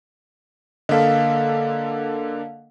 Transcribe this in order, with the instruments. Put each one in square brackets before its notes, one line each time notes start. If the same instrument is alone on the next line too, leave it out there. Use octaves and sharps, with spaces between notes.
[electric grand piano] D3 A#3 A4 [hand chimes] D#5 F5